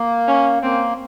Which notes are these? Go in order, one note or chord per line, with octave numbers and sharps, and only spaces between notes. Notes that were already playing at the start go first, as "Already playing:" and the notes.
Already playing: A#3
C#4
A#3 C4